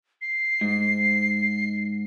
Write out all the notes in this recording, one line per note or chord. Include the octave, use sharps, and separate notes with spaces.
C7
G#2